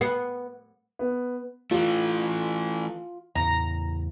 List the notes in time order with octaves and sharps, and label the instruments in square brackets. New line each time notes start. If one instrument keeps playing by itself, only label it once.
[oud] B3
[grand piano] B3
[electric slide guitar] E3 A3 [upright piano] F4
[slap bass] E2 A2 C#3 [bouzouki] A#5